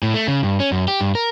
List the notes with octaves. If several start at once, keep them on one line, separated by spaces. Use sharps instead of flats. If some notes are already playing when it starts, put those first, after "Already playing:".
A2
A3
C#3
G2
C#4
F#2
G4
G2
A#4